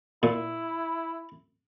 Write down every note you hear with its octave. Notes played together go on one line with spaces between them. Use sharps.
A#2 E4